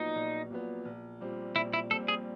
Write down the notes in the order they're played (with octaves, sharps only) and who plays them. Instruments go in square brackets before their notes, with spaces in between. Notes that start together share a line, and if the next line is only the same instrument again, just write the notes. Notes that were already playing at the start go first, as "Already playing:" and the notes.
Already playing: [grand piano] A#1 A#2 F#3 B3 [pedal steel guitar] D#4
[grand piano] A#1
A#2 F#3 B3
A#1
A#2 G3 C4
[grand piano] A#1 [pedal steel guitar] E4
[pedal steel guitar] E4
[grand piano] A#2 G3 C4 [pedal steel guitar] A4
[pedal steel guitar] G#4